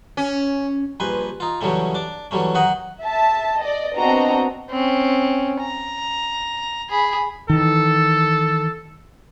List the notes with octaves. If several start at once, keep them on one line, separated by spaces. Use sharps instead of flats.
C#4
A#1 G2 B4 G#5 C6
D#4 F4
E2 C#3 F#3 G3 A3 C#4
D4 D6
E3 F#3 G3 A3 C#4
F#2 D#3 F#4 D#5 F#5
E5 A5
D5 D#5
B3 C4 D4 F#4 D#5 A#5
C4 C#4
A#5
G#4 B5
D#3 E3 A4